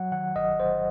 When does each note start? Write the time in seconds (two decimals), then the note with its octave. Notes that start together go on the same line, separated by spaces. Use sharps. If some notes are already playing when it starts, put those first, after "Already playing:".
Already playing: F#3 F#5
0.12 D#3 F#5
0.36 G1 D#5
0.60 G1 C5